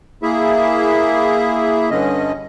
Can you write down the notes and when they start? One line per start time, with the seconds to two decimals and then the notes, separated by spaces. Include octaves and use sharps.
0.23 A#3 E4 G#4 E5
1.90 G2 D3 C#4 D#5